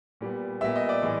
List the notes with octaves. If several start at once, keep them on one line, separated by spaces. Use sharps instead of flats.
A#2 G3 B3
A#2 G3 B3 E5
D#5
D5
A2 E3 G#3